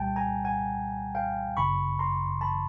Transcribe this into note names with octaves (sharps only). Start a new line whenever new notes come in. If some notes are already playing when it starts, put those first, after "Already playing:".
Already playing: C2 A#2 G3 G5 A5
G#5 A#5
F#5 G#5
F5 G5
G1 F#2 C#3 B5 C#6
A#5 C6
A5 B5